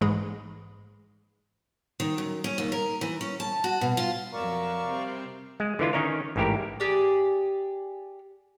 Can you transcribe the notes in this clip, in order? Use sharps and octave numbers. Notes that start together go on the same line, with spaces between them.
A#1 G#2 E3 G#3 G#4 B5
D#3
F#2
C#4
D#2
A#4
E3
C#4
A5
F#4
B2
F4
F2 F#3 A#4 D5 E5 F5 C#6
C3 G3 C4
G#3
D3 E3 E4 F4
D#3 C#4 D#4 A#4 C#5
A1 G#2 E4 G4 A#4
G4 G#4 D5